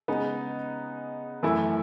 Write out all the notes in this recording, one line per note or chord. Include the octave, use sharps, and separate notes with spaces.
C#3 G#3 B3 D#4
F#2 E3 A3 E4